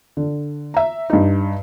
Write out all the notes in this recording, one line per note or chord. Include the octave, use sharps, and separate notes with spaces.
D3
E5 A#5
G2 D#4